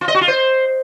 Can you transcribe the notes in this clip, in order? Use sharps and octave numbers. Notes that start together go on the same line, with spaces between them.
F4
D#5
F#4
F4
C5